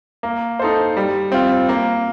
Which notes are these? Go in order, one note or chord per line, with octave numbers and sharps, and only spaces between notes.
A#3
D#4 A4 C5
G3
C4 F4
A#3